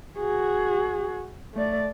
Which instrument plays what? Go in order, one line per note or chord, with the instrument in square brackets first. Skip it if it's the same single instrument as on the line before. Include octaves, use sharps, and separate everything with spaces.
[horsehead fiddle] F#4 G#4
A3 D5